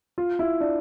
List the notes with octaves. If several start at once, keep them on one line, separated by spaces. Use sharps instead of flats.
F4
E4
D4